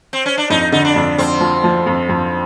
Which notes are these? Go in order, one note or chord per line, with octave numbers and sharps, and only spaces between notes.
C4
C#4
D4
F2 D#4
D3 D#4
D4
F2
F2 C4
F3
F3
F2
F2